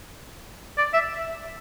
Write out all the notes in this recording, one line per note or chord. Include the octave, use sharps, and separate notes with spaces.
D5
E5